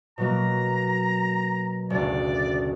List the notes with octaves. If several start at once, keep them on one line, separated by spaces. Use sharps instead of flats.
B2 F#3 A#3 A#5
F#1 D2 D5